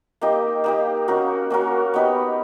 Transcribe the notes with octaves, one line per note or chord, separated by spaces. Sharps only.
A#3 D#4 G4
A#3 D#4 G4
A#3 C#4 F#4 A#4
A#3 C#4 F#4 A#4
B3 D#4 G4 B4